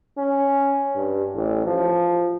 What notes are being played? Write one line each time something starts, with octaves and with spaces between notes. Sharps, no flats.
C#4
G2
A1
F3